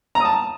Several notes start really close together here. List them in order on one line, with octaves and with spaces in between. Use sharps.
A#5 D#6 A5